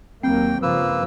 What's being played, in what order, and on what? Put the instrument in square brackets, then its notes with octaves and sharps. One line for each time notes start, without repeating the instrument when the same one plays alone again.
[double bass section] D#2 F#3 A#3 [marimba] C4 [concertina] G5
[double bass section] G2 C#3 F3 [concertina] A#3 B4 E6